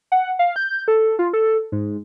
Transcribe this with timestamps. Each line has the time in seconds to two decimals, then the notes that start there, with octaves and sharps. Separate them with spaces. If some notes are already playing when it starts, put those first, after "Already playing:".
0.12 F#5
0.39 F5
0.56 G6
0.88 A4
1.19 F4
1.33 A4
1.72 G#2